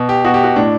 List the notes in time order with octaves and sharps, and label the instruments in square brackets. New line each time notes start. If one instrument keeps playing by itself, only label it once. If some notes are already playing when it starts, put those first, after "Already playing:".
Already playing: [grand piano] B2
G4
B2 F#4
G4
F#4
A2 D4